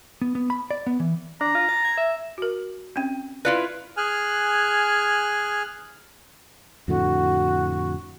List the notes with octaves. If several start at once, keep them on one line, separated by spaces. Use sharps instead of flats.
B3
B3
B5
D5
B3
E3
D4 A#5
F4
A6
G#6
E5
F#4 A#4
C4 C#4 G5
E4 F4 B4 D5 F5
G#4 G#5 F6 F#6
F2 A2 D3 F#4